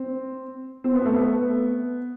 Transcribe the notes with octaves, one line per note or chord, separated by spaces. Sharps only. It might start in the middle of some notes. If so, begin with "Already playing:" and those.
Already playing: C4
C4
B3
A3
B3